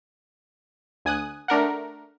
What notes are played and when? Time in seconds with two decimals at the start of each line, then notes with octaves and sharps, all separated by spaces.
1.05 D2 G#5 D#6 F#6
1.48 A3 D4 A#4 F#5